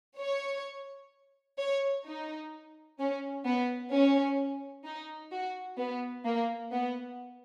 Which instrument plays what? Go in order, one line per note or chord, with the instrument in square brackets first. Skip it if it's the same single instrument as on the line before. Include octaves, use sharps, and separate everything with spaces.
[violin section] C#5
C#5
D#4
C#4
B3
C#4
D#4
F#4
B3
A#3
B3